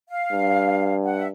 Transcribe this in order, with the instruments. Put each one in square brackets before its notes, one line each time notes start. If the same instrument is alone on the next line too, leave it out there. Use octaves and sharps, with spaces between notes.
[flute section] F5
[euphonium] G2
[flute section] F#5
E5